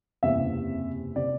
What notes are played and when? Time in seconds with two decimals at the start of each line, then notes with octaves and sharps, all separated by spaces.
0.23 F#1 E2 C3 E5
1.16 C3 D5